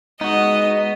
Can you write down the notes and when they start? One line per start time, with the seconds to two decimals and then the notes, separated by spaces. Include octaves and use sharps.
0.21 G#3 B3 D#4 F#4 D#5